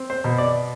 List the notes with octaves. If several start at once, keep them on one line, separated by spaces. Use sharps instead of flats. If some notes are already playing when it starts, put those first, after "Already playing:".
Already playing: C4
C5
B2
D5